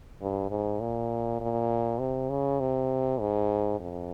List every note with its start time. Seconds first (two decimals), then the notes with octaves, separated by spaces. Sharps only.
0.21 G2
0.51 G#2
0.80 A#2
1.41 A#2
2.00 C3
2.30 C#3
2.60 C3
3.20 G#2
3.80 F2